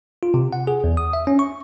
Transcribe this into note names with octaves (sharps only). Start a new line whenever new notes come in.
F4
C3
F#5
G#4
E2
D#6
E5
C#4
C#6